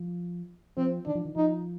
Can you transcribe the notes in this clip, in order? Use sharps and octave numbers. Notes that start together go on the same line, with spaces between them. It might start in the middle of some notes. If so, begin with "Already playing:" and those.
Already playing: F3
F3 C4
D#3 D4
F3
D#3
F3 D#4